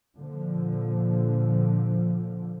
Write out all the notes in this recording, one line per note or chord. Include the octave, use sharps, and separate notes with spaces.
A#2 D3 F3